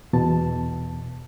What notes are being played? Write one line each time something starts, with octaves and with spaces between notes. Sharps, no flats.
E2 B2 A5